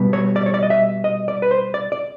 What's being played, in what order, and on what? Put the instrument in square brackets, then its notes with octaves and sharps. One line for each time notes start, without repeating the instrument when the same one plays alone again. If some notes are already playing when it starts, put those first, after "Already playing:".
Already playing: [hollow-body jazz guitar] B2 G3 B3
C#5
D5
C#5
D5
D#5
E5
D#5
D5
B4
C5
D5
D5